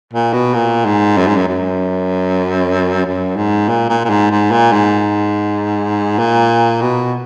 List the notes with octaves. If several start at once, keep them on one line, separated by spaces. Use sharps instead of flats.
A#2
B2
A#2
G#2
F#2
G#2
F#2
F#2
F#2
G#2
A#2
A#2
A#2
G#2
G#2
A#2
G#2
A#2
B2